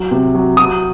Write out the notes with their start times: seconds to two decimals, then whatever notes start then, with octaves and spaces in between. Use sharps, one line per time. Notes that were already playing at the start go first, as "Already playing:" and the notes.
Already playing: F#3
0.11 C3
0.35 F#3
0.57 F#3 D#6